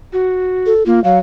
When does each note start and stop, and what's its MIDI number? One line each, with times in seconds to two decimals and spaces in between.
0.13 0.73 66
0.66 0.86 69
0.86 0.99 58
0.86 1.03 65
1.04 1.18 54
1.04 1.18 77